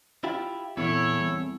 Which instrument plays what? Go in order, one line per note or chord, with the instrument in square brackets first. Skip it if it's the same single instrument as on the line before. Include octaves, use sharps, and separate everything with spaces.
[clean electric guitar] E4 F4 G4
[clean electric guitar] E2 [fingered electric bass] A#2 B3 C4 [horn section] E4 A4 C#5
[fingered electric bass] G3 C4